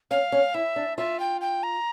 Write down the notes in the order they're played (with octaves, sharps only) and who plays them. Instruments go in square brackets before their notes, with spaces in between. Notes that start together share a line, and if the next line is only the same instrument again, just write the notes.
[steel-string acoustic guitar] C#4 [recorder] F5
[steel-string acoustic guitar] C#4
[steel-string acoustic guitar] E4 [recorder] E5
[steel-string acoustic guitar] D4
[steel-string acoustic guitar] F4 [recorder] E5
[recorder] G5
G5
A#5